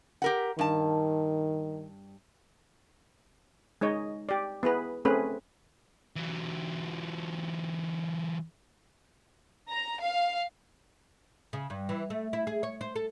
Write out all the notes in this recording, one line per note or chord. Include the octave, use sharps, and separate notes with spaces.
G4 A#4 F#5
G2 D#3 A5
G#3 D#4 C#5 D#5
G4 D5
B3 E4 G#4 B4
A3 C4 C#4 G#4 B4
E3 F#3
A#5
F5
C#3
G2
E3
A3
E4
G#4
C#5
C5
A4